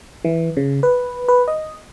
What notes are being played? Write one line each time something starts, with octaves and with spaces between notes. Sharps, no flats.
E3
C#3
B4
B4
D#5